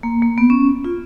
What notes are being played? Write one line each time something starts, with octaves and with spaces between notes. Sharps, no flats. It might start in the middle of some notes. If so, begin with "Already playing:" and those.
A#3
A#3
B3
C#4
F4